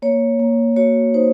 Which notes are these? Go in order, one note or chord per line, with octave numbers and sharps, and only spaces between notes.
A#3 C#5
A#3
F#4 C#5
D#4 C5